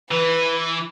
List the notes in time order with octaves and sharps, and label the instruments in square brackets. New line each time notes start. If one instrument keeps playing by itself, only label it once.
[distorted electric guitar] E3 [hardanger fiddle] B4